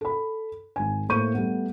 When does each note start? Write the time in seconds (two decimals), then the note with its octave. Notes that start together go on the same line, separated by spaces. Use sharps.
0.01 A4 B5
0.76 G#1 G#5
1.09 A2 A#3 C5 C#6 G6 D#7
1.34 G3 A3 B3